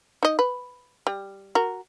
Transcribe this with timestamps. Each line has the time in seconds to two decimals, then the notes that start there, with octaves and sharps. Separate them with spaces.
0.23 D#4 D#5
0.39 B4
1.07 G3
1.55 F#4 A#4